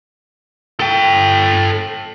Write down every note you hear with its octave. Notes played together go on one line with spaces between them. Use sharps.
A4 G5